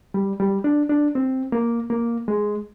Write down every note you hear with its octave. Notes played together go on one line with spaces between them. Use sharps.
G3
G3
D4
D4
C4
A#3
A#3
G#3